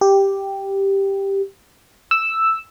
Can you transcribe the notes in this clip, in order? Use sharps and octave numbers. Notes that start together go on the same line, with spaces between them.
G4
E6